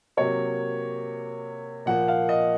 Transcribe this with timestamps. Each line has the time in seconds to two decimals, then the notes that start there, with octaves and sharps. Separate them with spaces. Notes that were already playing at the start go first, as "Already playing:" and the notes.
0.17 C3 F#3 A#3 C#5
1.86 A#2 F3 A#3 F#5
2.08 F5
2.29 D#5